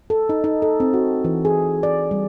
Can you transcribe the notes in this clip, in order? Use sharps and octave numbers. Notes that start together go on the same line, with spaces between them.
A4
D#4
D#4
A4
C4
F#4
E3
G#4
D5
G3